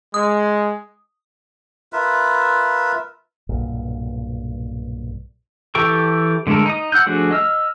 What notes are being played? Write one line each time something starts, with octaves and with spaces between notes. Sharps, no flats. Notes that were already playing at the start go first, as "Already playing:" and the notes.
G#3 D#6
F4 A#4 B4 E5
B1 G2 A#2
E3 G4 A4 G5 C#6
D3 G#3 A3 A4 A#4
D#4 D#6
F#5 E6 F#6 G6
F3 A3 D4 F#4 G#4
D#5 E6 F6